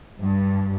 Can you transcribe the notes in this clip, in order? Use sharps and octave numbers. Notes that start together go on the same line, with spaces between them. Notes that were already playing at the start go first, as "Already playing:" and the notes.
G2